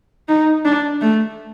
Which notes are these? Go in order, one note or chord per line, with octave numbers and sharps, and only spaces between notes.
D#4
D4
A3